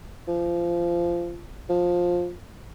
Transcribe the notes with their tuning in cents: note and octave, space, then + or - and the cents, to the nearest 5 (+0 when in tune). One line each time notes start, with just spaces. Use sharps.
F3 -20
F3 +15